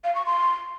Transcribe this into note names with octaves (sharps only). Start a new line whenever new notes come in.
F5
C#6
C6